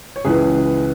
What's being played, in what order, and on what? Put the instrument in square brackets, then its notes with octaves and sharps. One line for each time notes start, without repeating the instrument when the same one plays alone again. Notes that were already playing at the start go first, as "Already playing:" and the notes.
[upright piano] C#5
C#2 C#3 E3 G#4 B4